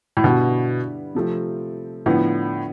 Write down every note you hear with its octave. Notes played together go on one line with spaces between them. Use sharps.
A2
G2 B2 D3 G3 B3 E4
C3 F3 A3 C4
A2 D3 F3 B3